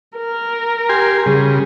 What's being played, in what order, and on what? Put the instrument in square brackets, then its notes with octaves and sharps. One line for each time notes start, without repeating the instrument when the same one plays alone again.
[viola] A#4
[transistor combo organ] G4 G#5 C6
[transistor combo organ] C#3 G3 [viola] G#4